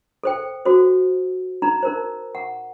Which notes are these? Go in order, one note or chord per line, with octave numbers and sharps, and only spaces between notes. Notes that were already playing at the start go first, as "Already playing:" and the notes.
A4 C5 G5
F#4 A4 C5
D#4 A#5
D#4 A#4 C5
F#5